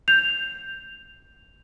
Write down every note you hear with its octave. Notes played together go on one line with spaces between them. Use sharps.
G6 F7